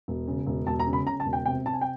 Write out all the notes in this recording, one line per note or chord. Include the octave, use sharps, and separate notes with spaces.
E1
C#3
E1
E1 A5
A#5
C#3
B5
C#3 A#5
A5
E1
G5
C3 G5
C3 A5
G#5
G5